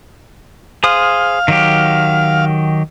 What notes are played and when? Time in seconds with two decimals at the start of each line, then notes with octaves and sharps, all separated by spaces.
0.84 G#4 C5 F5 D#6
1.48 D#3 F#3 G4